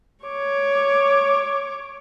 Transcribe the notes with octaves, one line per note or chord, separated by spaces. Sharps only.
C#5 D6